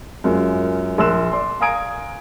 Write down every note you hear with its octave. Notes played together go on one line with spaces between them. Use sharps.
F#2 G#3 A#3 F4
A#1 A#4 C6 E6 F#6 E7
D5 C6
F5 G#5 A#5 D#6 G#6 D7